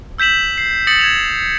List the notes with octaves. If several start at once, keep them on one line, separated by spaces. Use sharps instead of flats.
E6 G6 B6 E7 F#7
C7
D#6 A6 A#6 C#7 F#7
G#6 E7 F7